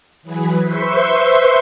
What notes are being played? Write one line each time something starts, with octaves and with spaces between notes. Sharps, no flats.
E3 F#3 G#4 B4
B4 C5 E5 C6 C#6